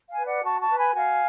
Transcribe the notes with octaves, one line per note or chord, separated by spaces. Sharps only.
F5 G#5
B4
D5 F#5
F#4 A5 C#6
A5 C#6
B4
G#5 B5
F#4 F5 G#5